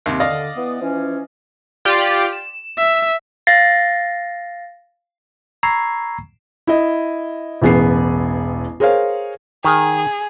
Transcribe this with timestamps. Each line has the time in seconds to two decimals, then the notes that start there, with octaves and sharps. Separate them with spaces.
0.06 D#2 C3
0.20 D3 D5 D#5 F5
0.56 E3 B3
0.79 E3 F3 C#4
1.85 F4 G4 D5
2.33 E7
2.78 E5
3.47 F5 A6 A#6 C7
5.63 A#5 B5 C#6 E6 G#6 C7
6.67 E4 D#5
7.61 E1 A1 B3 G#4 C7
8.80 G#4 A#4 C5 C#5 F5
9.65 D#3 G#4